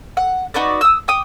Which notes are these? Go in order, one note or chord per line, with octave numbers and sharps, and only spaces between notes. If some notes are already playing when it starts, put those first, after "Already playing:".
F#5
D#4 F#4 B4 D5
D#6 E6
G5 D6 D#6